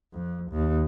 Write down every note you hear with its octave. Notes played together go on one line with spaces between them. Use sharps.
F2
D#2